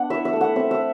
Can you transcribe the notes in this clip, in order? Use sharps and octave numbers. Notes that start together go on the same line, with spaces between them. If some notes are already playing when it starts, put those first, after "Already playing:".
Already playing: B3 D4 F#5
E4 E5
E5
A3
F#5
C4 E5
E5